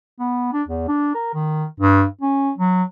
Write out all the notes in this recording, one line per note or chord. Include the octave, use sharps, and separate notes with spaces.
B3
D4
E2
D4
A#4
D#3
G2
C#4
F#3